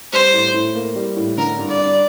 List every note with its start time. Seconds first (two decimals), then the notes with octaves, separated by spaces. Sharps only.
0.12 G3 C5
0.34 A2
0.54 A2
0.75 A#3
0.96 G3
1.17 A2
1.37 D3 A#4
1.59 G2
1.69 D5
1.79 D4